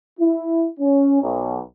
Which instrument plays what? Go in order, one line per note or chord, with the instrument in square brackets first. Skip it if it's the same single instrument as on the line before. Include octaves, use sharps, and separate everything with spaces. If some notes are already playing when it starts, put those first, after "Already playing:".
[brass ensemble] E4
C#4
B1